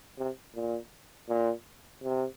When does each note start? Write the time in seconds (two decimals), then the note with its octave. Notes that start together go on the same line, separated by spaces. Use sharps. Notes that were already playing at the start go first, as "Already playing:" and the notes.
0.18 C3
0.55 A#2
1.29 A#2
2.03 C3